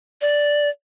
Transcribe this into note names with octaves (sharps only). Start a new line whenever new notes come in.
D5